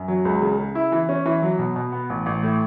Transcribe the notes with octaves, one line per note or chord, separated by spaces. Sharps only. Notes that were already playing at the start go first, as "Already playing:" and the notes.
Already playing: F#2
F#3
C#2
C#3
C#3
E4
E3
C#4
E3
F#3
B2
B2
B3
A1
A1
A2